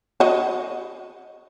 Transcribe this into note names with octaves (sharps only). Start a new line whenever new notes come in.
F#4 D#5